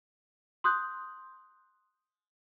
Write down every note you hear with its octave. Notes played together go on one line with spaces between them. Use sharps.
C6 D#6 F#6 G6